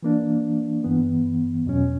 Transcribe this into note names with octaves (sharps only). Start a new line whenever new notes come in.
E3 A#3 D4
G2 E3 B3
E2 B2 F#3 C#4